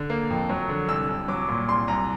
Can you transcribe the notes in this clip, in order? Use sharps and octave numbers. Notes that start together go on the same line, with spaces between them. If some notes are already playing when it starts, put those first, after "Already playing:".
Already playing: D3
A#3
F2
F#3
D3
C2 E6
C2
F#3 D6
A#2
C2 C6
C2 A#5